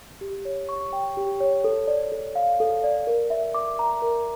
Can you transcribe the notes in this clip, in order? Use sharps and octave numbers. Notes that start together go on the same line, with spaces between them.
G4
C#5
C#6
G5
G4
C#5
A4
D5
A4
F5
A4
D5
A#4
E5
D6
A#5
A#4